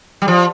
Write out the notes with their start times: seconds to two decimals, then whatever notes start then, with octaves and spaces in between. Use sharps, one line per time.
0.22 G3
0.28 F3